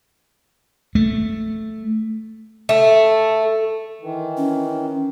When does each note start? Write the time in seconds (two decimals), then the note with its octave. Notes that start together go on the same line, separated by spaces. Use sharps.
0.95 A3
2.69 A3
4.01 D#3 E3
4.37 C#4